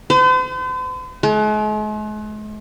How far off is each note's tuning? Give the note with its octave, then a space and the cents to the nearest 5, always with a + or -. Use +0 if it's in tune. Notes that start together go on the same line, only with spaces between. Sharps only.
C5 -45
G#3 +45